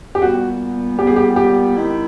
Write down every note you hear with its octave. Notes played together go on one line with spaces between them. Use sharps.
G4
A#2 G3 B3 F#4
A#2 G3 B3 G4
G#4
G4
G4
D#3 G#3 C4 E4